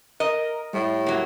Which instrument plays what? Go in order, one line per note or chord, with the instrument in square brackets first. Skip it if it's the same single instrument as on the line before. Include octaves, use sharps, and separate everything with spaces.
[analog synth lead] A#4 [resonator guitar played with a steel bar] D#5
[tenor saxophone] A2 [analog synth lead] G3
[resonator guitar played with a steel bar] F#3 A#3